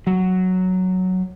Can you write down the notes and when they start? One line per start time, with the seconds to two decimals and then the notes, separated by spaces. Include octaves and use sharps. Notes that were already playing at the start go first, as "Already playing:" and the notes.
0.07 F#3